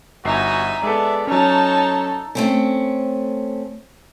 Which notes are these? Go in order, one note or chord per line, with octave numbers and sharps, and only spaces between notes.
G1 D#4 F#4 E5 G#5 C7
G#3 B3 A4 D5 E5
F#3 C#4 D#4 A4 C#5 A5
A3 C4 C#4